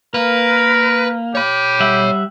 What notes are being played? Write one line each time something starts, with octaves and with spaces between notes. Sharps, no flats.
A#3 A#4 B4
G4 C#5 B5
G3 E5 F#5